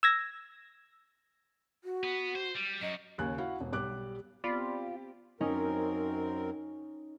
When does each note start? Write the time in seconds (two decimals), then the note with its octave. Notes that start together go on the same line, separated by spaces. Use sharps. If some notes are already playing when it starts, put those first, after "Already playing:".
0.03 E6 G#6 A#6
1.84 F#4
2.04 B3
2.35 C5
2.55 G3
2.82 F#2 D#5
3.18 D#2 C#3 G#5 F#6
3.38 E4 F#4 F5 F#5
3.61 E1
3.73 B1 G3 G4 D6 F#6
4.44 B3 C4 F4 G4 D5 B5
5.41 F#2 C4 C#4 D#4 A#4